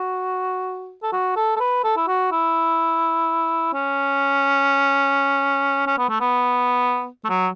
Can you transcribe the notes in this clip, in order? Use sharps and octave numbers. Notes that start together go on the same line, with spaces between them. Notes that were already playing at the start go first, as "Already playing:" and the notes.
Already playing: F#4
A4
F#4
A4
A4
B4
A4
E4
F#4
E4
C#4
C#4
B3
A3
B3
A3
F#3